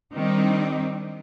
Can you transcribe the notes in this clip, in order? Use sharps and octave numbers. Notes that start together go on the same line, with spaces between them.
D#3 G3 C4 D4 D#4